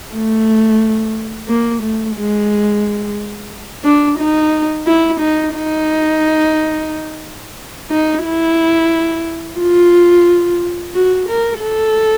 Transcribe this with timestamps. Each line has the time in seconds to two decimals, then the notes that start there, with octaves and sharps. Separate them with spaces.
0.14 A3
1.48 A#3
1.83 A3
2.16 G#3
3.85 D4
4.19 D#4
4.87 E4
5.20 D#4
5.55 D#4
7.91 D#4
8.25 E4
9.60 F4
10.95 F#4
11.29 A#4
11.62 A4